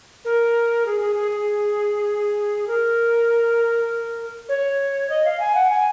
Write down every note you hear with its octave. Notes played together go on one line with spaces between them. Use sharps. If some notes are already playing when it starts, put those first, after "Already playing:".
A#4
G#4
G#4
G#4
G#4
A#4
C#5
D#5
F5
G#5
F#5
G#5